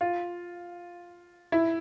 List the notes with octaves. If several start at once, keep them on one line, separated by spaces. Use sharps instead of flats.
F4
E4